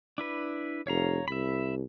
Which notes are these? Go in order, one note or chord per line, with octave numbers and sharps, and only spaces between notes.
D4 E4 B4
F1 C#5 F5 A#5
C2 E5 B5